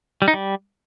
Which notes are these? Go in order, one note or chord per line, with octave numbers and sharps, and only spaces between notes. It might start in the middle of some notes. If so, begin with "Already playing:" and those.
G3
D#4
G3